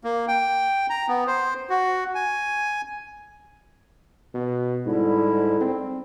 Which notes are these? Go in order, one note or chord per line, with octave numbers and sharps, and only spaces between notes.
A#3
G5
A#5
B3
C5
F#4
G#5
B2
G#2 D3 G3 E4
C4